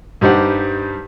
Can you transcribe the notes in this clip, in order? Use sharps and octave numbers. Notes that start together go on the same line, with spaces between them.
G2 G3 D#4 G4 C5 F#5